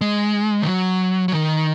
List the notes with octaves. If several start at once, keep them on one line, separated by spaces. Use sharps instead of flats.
G#3
D#3
F#3
F#3
D#3